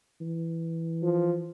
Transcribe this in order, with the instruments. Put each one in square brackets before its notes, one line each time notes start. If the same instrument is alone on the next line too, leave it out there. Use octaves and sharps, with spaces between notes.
[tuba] E3
[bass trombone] F3